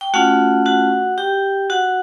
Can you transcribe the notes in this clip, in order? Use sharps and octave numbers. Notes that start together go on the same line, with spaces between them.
G5
A3 C#4 F4 F#4 F#5
F#4 F#5
G4 G5
F#4 F#5